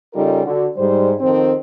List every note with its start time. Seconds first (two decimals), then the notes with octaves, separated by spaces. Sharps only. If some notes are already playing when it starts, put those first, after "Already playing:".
0.14 C#3 G3 D#4 F4 A4 A#4
0.44 D3 F#4
0.77 G#2 G3 C5
1.21 F2 D#3 F3 C4